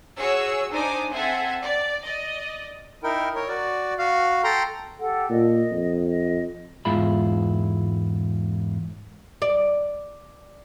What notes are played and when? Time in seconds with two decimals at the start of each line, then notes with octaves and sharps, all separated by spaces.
0.18 F#4 G#4 C#5 E6
0.71 D4 D#4 C5 G#5 D6 D#6
1.12 C4 A4 E5 F#5 G#5 G#6
1.61 D5
2.04 D5 D#5
3.03 D#4 E4 A#4 G5
3.35 A#4 C#5
3.48 F#4 D5
3.99 F#4 F5
4.44 A4 G5 A#5 C6
4.98 G4 A4 F#5
5.30 A#2 D#5
5.71 F2
6.07 D#5
6.85 E2 G#2 G#3 E4 F4 B5
9.42 D5